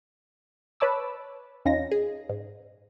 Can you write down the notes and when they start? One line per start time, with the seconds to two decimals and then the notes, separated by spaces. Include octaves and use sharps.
0.80 B4 C#5 A5 D6 E6
1.65 E2 C#4 D#4 F4 A#6
1.91 G#4
2.29 G#2